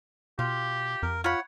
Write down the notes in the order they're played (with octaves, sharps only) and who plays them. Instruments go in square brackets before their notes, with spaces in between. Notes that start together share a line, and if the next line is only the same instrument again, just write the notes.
[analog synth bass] B2 [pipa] F4 [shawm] G4
[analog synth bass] F2 [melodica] A#4
[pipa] F4 B5 [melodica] C#5 F#5